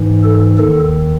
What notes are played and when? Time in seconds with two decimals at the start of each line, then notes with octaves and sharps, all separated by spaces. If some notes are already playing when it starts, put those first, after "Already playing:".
Already playing: G#2 E3
0.23 A4
0.58 D#2 D#3 A4